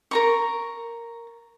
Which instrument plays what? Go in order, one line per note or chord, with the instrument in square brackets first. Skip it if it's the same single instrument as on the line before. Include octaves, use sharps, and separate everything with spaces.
[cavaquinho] A#4 A#5 C#6